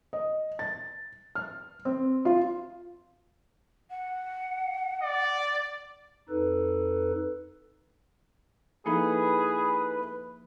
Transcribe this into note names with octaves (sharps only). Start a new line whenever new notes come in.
D#5
A6
F6
C4
F4
F#5
D5
F2 D#4 A4 B4
F3 A#3 D#4 E4 G#4 A4 B4